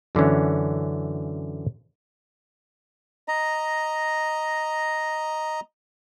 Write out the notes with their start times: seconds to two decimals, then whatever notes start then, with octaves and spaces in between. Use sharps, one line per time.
0.15 F#2 D3 E3 C#4
3.28 D#5 A#5